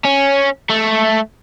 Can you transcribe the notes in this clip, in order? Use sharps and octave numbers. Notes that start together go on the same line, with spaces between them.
C#4
A3